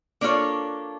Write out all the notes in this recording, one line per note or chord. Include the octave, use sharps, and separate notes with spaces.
A#3 D4 F4 A4 C#5